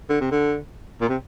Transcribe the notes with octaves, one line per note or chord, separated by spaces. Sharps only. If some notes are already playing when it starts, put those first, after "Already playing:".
D3
C3
D3
A#2
C3